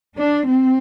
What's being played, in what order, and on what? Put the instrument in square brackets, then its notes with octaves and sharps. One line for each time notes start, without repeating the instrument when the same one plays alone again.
[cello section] D4
C4